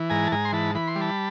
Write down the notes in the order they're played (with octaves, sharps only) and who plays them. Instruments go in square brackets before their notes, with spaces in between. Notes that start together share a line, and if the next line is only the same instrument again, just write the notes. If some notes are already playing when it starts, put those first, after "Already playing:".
Already playing: [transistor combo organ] E3
G#2 G#5 A#5
A5
G#2 G#5 A#5
C6
E3 A5 B5
E3 B5
C6
G3
A5 B5